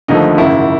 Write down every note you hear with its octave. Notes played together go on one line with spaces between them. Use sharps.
D#2 D3 F3 A3 D#4
G#1 F#2 C#3 E4